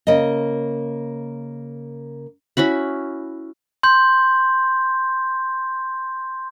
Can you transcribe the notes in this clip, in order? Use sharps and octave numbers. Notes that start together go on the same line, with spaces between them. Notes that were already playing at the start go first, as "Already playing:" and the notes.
C#3 A#3 D#5
C#4 E4 F#4 B5
C6 G6